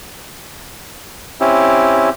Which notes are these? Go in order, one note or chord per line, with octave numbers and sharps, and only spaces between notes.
C4 C#4 E4 G4